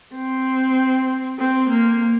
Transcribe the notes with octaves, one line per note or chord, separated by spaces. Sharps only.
C4
C4
A#3